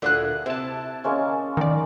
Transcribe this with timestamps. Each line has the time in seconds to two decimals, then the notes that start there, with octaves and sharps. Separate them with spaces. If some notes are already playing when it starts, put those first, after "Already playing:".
0.02 D2 A#2 D3 E4 G#4 F#6
0.46 C3 E4 A5
1.04 G#3 A#3 C#4
1.57 D#3 D5